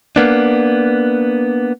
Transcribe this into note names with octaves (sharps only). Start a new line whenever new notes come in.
A#3 B3 D4